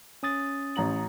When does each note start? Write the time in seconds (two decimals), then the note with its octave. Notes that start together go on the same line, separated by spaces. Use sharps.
0.23 C#4 D#6 A6
0.76 A1 A#5 F#7